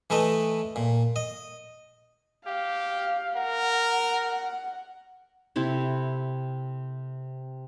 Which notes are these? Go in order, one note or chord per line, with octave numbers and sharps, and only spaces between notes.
E3 A3 B4 D#5
A#2
D#5
G4 F5
A#4 F#5
C3 C4 E4 A4